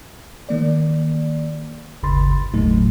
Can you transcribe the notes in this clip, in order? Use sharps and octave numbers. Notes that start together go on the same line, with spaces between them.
D#3 A#3 D5
G1 D#2 C#3 B5 C6 A6
G1 D#2 A2 F#3 A3 D#4